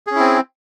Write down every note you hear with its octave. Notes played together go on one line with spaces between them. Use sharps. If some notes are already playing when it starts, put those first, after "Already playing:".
C4 C#4 E4 G#4